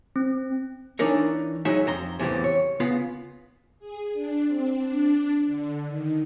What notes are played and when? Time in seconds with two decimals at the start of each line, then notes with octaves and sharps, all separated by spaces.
0.16 C4
0.99 E3 D4 D#4 A#4 C#5
1.65 F#3 G#3 D#4 C#5 E5
1.87 F2 A#5 C6
2.19 E2 A2 C#3 E3 G3 C4
2.44 C#5
2.80 C#3 B3 F4
3.80 G#4
4.13 D4
4.46 C4
4.79 D4
5.46 D3
5.87 D#3